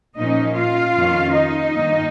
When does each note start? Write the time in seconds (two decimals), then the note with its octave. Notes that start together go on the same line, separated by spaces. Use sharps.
0.18 A#2 F3 A#3 C#4 D#4 D#5
0.56 F4 F5
0.96 F2 D#3 A#3 C#4
1.34 D#4 D#5
1.74 G2 D#3 A#3